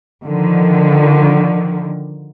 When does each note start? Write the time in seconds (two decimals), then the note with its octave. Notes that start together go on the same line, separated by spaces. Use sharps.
0.24 D3 D#3 F3